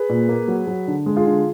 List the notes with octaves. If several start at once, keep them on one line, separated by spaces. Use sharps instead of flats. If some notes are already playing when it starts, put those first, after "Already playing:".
Already playing: G#4 B4
A#2
A#3
F#3
F#3
D3
G#3
F4 G#4
D3